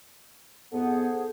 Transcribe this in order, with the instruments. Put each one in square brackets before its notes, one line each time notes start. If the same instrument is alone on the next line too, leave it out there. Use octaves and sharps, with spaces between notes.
[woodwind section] F2 G#2 B3 [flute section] G#4 C5 F#5 [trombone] A4